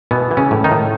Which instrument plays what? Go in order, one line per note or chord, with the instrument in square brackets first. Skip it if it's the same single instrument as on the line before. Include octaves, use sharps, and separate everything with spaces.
[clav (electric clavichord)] B2 E3 B3
E3
C#3 C#4
A2
D#3 D#4
A2